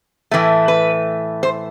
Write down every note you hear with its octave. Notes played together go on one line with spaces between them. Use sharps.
A2 E3 A3
B4
C5